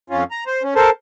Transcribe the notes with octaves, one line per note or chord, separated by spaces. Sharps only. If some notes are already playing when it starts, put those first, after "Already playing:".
F2 C#4 F4
A#5
C5
C#4
A4 A#4 C5 A5